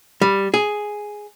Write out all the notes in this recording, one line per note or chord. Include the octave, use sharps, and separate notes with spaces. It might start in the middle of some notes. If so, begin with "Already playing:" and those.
G3
G#4